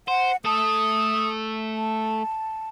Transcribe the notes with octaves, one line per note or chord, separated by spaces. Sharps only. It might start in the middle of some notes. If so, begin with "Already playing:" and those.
C5 F#5
A3 A4 D#6
A5